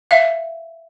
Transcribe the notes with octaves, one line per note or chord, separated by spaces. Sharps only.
E5 F5